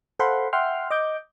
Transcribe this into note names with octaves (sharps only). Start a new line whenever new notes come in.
A4 C5 F5 F#5 B5 C6
E5 F#5 G5 C6 F6
D#5 D6 G6